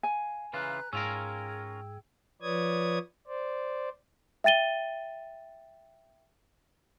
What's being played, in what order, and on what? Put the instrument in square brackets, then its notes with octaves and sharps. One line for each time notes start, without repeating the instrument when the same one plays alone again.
[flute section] F5 [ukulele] G#5
[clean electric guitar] C#3 E3 F4 [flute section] B4 A#5 F#6
[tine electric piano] G#2 E6 [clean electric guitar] C#4 F4 A#4 [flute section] G#4 G5
[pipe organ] F3 B4 C#5 D5 D#6 G#6
C5 D5
[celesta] E5 G5 A6 D#7 G7